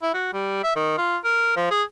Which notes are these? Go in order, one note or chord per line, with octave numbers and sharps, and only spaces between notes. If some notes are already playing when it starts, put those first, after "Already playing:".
E4
F#4
G3
E5
D#3
F4
A#4
F3
G#4